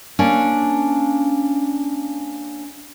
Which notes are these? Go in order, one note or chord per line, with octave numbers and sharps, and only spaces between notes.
A#3 C#4 D4